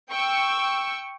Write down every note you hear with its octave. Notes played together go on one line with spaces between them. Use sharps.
G5 C#6 E6